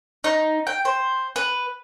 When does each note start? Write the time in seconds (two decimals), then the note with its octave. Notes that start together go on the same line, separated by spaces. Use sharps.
0.24 D#4
0.67 G5
0.85 C5
1.36 B4